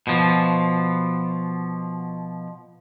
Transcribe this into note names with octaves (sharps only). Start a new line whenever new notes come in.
B2 F3